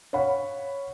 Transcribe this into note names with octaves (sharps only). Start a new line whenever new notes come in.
C#5 F5 F#5 B5